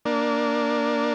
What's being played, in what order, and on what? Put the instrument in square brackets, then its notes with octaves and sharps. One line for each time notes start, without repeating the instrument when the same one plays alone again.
[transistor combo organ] A#3 D4